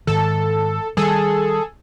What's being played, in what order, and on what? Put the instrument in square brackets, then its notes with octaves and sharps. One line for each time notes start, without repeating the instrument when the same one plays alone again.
[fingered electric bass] G#2 D#3 [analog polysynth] A4
[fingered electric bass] D#3 G3 [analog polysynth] G#4 A4